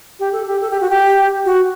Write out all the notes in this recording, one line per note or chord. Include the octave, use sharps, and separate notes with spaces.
G4
A4
G4
A4
G4
F#4
G4
F#4